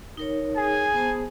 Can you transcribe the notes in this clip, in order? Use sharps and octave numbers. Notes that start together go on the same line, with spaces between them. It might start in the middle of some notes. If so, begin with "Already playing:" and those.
D#4 A#4 C#5
G#4 G#5
B3 C5 A5